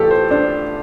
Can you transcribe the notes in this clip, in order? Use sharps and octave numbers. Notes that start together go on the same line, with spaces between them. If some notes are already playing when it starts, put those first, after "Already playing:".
Already playing: A1 A3 F4 G4 A4
C5
D4 C5